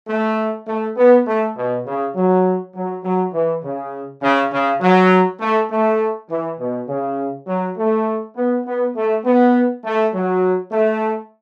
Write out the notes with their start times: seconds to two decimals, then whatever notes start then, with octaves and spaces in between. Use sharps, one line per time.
0.08 A3
0.68 A3
0.97 B3
1.26 A3
1.56 B2
1.86 C#3
2.16 F#3
2.75 F#3
3.04 F#3
3.33 E3
3.63 C#3
4.22 C#3
4.52 C#3
4.81 F#3
5.40 A3
5.70 A3
6.30 E3
6.58 B2
6.88 C#3
7.47 F#3
7.77 A3
8.36 B3
8.66 B3
8.96 A3
9.24 B3
9.84 A3
10.14 F#3
10.72 A3